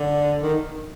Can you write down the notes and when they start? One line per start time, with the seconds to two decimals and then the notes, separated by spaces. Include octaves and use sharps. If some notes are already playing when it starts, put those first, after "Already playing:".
Already playing: D3
0.43 D#3